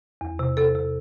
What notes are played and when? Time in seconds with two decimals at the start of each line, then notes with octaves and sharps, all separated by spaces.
0.21 E2
0.39 C3
0.57 C3 A4
0.75 C3